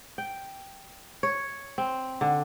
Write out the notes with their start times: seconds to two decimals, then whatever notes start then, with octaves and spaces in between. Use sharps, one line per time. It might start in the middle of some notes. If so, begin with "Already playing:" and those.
0.18 G5
1.23 C#5
1.78 C4
2.21 D3